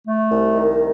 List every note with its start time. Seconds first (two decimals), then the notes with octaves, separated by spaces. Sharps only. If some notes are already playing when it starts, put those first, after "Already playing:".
0.06 A3
0.31 C2
0.55 D#3